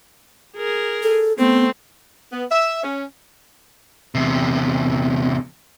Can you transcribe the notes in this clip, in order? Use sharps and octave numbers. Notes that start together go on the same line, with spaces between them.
G#4 A#4
A4
A3 B3 C4
B3
E5
C#4
E2 C3